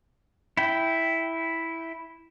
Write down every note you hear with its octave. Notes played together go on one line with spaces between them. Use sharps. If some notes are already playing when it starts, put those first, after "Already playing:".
E4 G5